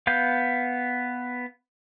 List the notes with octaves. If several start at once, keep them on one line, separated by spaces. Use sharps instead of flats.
B3 F5 G6